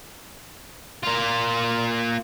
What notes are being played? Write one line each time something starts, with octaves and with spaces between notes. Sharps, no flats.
A#3 F4